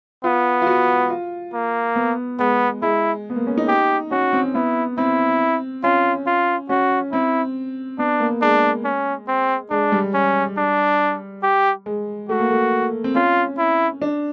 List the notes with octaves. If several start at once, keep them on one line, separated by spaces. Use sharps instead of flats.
B3 F4
F4
F#4
F4
A#3
B3
G#3 B3
G#3 E4
B3
A#3
C#4
D#4
G4
C#4 F#4
C4
B3 E4
C4 E4
C#4 F4
F4
C#4 F#4
C4 E4
B3 D4
A#3
G#3 D4
C#4
C4
G#3 D4
G3
C#4
D4
G4
G#3
A3 F#4
A#3
A3
C4
C#4 F4
E4
D4